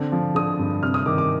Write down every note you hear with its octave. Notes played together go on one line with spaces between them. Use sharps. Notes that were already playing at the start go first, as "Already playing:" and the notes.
Already playing: D3 C4
F3
D3 D#6
G2
C3 F6
D#6
D#3 D6
D6